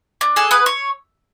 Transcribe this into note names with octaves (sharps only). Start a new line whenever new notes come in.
D4
G#4 A4
B3 B4
C#5